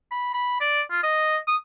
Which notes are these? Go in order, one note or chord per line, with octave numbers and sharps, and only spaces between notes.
B5
B5
D5
F4
D#5
D#6